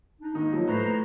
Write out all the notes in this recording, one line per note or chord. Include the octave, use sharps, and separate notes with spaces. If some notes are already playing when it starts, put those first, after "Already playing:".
D4 D#4
D#3 G#3 A#3 D#4
F3 F#3
A2 B4 C5 A#5